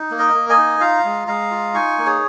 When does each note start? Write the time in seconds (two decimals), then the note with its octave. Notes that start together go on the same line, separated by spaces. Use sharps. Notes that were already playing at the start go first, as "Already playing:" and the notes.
Already playing: D#4
0.11 A#3
0.18 A#4 D#5
0.34 A#3
0.49 D#5 G#5
0.58 D#4
0.80 F4 F5 A#5
1.05 G#3
1.27 G#3 F5 A#5
1.51 F4
1.74 D#4 G#5 C#6
1.98 A#3
2.06 G#4 C#5